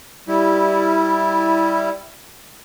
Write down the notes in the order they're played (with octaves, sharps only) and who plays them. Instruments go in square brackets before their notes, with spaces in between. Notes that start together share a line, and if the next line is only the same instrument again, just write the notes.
[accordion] G3 E4